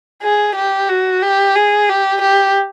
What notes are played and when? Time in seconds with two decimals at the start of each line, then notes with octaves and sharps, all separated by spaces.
0.23 G#4
0.56 G4
0.89 F#4
1.22 G4
1.56 G#4
1.89 G4
2.22 G4